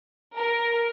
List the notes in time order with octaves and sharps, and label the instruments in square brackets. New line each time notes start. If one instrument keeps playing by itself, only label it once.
[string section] A#4